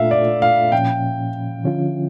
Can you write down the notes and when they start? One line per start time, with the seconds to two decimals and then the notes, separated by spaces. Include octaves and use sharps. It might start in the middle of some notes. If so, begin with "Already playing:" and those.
Already playing: A#2 A3 D4 F4 A4 E5 F5
0.11 D5
0.42 F5
0.72 A#2 F3 C#4 G5
1.64 D3 F3 C#4 F4